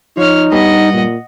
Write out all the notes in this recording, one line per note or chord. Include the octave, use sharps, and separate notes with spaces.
F3 D#4 C#5 F6
G2 G3 B3 D#5 F#5
A#2